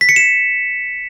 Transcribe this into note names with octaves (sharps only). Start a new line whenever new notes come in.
B6
C#7
E7